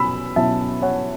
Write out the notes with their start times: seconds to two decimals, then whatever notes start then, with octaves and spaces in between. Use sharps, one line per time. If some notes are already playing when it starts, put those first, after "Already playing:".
Already playing: B2 F#3 C#4 B5 E6
0.36 B2 F#3 C#4 E4 E5 A5
0.82 C#5 F#5